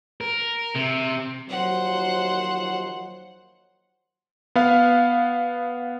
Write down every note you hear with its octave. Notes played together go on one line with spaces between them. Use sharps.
A#4
C3
D#2 F3 F#3 C5 F#5
B3 F5